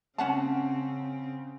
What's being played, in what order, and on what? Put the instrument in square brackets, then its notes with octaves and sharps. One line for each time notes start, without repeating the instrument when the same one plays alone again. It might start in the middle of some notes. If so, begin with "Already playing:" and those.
[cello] C#3 C4 [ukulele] C#4 F#5 A5